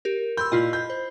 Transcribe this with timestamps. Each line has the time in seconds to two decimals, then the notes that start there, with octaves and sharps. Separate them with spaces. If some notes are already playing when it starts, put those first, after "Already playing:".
0.05 G4 A#4
0.37 B5 C6 E6 G6
0.52 A#2 E4 F4 D#5
0.73 B5 G6
0.90 C5